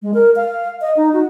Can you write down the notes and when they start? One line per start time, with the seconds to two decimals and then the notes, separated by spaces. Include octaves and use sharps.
0.02 G#3
0.14 A#4
0.36 F5
0.81 D#5
0.97 D#4
1.13 F#4